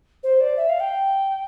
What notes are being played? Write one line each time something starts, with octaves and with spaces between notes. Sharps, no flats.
C5
D5
E5
F5
G5